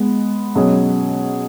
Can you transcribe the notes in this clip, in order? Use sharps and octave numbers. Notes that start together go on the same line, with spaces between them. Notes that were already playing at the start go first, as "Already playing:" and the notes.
Already playing: G#3 B3
B2 F#3 C#4 G#4 D#5